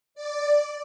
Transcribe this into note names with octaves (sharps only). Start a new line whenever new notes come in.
D5